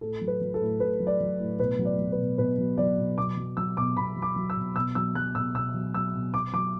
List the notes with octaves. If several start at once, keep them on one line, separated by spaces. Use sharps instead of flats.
A2 A4
F#3
B4
F#3
A4
A2
A2 B4
F#3
D5
F#3
A2
B2 B4
F#3
D5
F#3
B4
B2
B2 B4
F#3
F#3 D5
B2
B2 D6
F#3
F#3 E6
B2 D6
B2 B5
F#3
D6
F#3
E6
B2
B2 E6
F#3 E6
F#3 F#6
B2 E6
B2 E6
F#3
F#3 E6
B2
B2 D6
F#3 D6